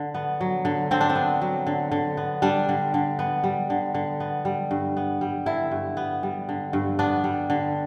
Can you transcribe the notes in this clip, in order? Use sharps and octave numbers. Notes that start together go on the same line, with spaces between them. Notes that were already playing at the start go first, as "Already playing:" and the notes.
Already playing: D3
B3
F#3
D3
D3 C4
D4
C4
B3
F#3
D3
D3
B3
G3 D4
D3
D3
B3
G3
D3
D3
B3
G3
G2
B3
G3
D3 E4
G2
B3
G3
D3
G2
B3 D4
G3
D3